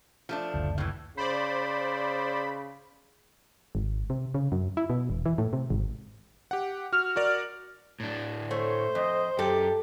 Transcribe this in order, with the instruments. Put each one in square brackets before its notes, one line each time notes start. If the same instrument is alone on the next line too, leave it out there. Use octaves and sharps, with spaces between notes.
[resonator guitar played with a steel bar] F3 A3 D4
[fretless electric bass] F#1 D2
[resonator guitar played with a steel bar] A2 E3
[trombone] C#3 [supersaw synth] C5 D5 [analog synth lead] B5
[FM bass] G#1
C3
C#3
F#2
E4
B2
E1
E3
A2
C3
G#1
[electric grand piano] G4 F#5
[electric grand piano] F#4 [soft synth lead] F6
[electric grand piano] F#4 A#4 D5
[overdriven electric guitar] A2 D4
[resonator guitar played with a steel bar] A3 [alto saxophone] C5 [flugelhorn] C#5
[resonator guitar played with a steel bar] F2 [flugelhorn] D#5
[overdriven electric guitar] F#2 [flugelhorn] G4 [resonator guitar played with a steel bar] A4